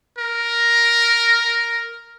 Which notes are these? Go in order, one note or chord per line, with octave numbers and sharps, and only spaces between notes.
A#4